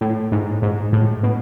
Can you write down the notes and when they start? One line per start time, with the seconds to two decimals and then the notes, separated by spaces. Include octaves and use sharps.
0.01 A2
0.32 G#2
0.62 G#2
0.93 A2
1.23 B2